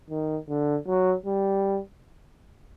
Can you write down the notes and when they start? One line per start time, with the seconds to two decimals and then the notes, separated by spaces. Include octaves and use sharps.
0.10 D#3
0.49 D3
0.88 F#3
1.26 G3